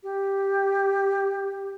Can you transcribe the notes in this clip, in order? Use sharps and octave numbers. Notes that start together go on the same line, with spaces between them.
G4